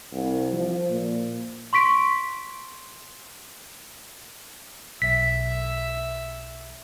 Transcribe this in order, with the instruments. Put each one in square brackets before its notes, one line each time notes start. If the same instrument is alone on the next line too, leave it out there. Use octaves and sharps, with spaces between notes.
[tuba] C2
F3
A#2
[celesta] C6 C#6 B6 D7
[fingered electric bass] B1 [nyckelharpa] E5 [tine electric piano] B6